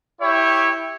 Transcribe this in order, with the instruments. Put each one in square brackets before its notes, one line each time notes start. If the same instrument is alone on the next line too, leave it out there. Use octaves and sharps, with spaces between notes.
[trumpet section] E4 G4 C#5 G5